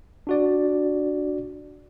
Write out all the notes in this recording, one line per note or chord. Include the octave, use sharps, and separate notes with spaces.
D4 F#4 D5